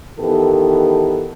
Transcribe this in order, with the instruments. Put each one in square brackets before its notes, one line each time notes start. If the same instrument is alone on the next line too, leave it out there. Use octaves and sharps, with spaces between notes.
[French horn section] D#3 E3 B3 G4 A4